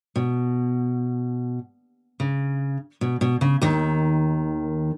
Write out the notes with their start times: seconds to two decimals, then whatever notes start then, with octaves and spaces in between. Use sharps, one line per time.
0.16 B2
2.20 C#3
3.01 B2
3.21 B2
3.41 C#3
3.62 D#2 D#3